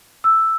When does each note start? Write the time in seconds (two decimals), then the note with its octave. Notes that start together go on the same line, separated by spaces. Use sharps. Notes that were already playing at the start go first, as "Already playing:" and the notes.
0.24 E6